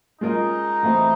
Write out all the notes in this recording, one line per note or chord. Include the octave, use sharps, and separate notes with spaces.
G#3 C#4 D#4 F4 A#4 D#5
E3 A3 C4 E4